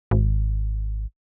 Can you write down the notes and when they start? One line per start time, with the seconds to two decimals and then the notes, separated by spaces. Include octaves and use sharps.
0.11 G#1